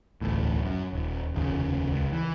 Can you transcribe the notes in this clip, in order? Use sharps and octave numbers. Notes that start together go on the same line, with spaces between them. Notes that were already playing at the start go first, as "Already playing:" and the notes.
E1 A1 D2 A2
F#2
D#1
F1 D#2 C#3
C#2
E3